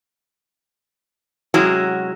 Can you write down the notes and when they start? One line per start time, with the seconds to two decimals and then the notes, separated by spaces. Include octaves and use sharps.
1.54 C3 F#3 G#3 C#4 E4 F#4